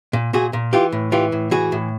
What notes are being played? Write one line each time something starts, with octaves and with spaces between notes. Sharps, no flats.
A#2
A#2 F#4 G#4
A#2
E3 F4 G4
A2
E3 F4 G4
A2
E3 F#4 G#4
A2